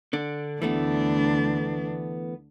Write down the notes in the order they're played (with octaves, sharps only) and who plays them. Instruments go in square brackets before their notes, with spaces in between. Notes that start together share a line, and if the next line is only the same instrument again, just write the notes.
[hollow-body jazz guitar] D3 D4
[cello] D2 D4 [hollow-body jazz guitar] E3 A3 B3